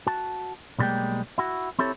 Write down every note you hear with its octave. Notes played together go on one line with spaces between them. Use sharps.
F#4 A5
B1 A2 G3 G#3 A#3 G5
E4 F#4
C4 E4 G4 A4 C#5